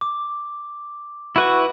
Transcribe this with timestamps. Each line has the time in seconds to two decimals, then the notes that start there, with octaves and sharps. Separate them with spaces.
0.01 D6
1.36 E4 F#4 B4 C#6